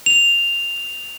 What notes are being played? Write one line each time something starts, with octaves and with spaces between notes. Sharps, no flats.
F7